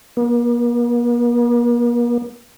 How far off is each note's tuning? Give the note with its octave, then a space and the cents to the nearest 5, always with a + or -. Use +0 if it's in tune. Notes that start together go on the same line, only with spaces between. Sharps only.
A#3 +45